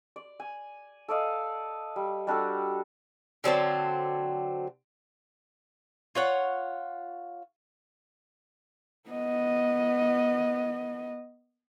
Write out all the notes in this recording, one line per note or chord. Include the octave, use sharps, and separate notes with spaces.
D5
G#5
A4 D5 D#5 F5
G3
G3 D4 F#4 A4
D3 F#3 C4 A5
F4 C#5 F#5
B3 D#5